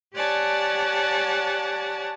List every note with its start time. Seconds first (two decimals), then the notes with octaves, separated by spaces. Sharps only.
0.14 G4 C#5 D5 F#5 G#5 A5